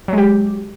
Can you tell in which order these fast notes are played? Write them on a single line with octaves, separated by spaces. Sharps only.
F#3 G#3 G4